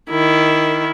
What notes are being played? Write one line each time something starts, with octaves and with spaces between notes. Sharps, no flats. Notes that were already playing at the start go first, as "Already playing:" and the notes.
D#3 E4